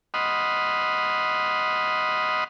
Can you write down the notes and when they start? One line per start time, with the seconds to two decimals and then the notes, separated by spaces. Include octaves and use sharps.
0.14 D#5 F#5 B5 C6 D#6 F6